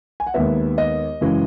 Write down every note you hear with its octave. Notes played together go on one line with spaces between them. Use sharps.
G#5
F#5
D#2 D#3 G#3 B3 E5
D#5
F#2 C#3 E3 G#3